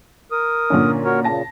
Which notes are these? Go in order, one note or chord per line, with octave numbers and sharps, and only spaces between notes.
A#4 D#6
A#2 D3 C#4
F#4 A#4 C#5
A#2 C#3 A5 A#6